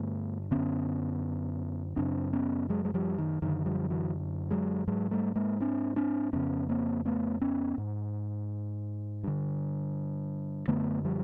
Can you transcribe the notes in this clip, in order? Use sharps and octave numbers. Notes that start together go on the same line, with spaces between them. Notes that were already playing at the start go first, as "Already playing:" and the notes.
Already playing: G2 D3 A3 B3
F#2 D3 B3 C#4
F#2 C#3 C4 D4
B3 C#4
F#3 G#3
G#3
F3 G3
D#3
F#2 D3 D#3
F3 G3
E3 F#3
F#3 G#3
G#2 F#3 G#3
G3 A3
G#3 A#3
C4 D4
C4 D4
F2 C#3 B3 C#4
A#3 C4
A3 B3
B3 C#4
G#2
G2 D3
F#2 D3 A3 B3
F3 G3